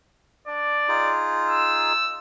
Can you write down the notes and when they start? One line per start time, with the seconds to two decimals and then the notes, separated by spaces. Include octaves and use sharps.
0.47 D4 D5
0.88 D#4 F4 G#4
1.47 E6